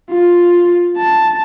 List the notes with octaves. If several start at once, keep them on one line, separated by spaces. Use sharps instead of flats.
F4
A5